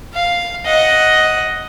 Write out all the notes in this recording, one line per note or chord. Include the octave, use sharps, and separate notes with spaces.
F5
D#5 F#5